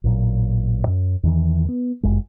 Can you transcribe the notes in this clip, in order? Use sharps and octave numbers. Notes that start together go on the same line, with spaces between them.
A1 A#2 F#3
F#2
E2 D#3 E3
B3
G1 F#2 G#3